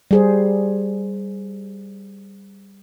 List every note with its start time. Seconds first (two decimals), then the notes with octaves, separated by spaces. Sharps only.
0.11 G3 G#4 C5